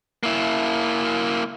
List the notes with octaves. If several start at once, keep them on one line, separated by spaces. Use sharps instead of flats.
A#3 E4